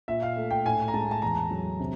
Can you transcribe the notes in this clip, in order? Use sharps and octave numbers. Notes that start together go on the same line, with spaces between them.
A#2 E5
F5
A3
G5
A2 G#5
A#5
G#3 A5
A5
E2 A#5
F#3
C3